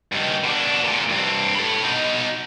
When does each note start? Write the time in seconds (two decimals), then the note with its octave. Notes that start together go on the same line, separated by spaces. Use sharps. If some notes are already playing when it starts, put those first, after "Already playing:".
0.12 G2 D#3
0.44 B2 D4
0.84 E2 A#2
1.09 G2 C4
1.55 A4 B5
1.84 B2 D#4